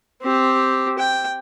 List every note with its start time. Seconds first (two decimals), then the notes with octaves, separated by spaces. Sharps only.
0.22 C4 G4
0.98 G5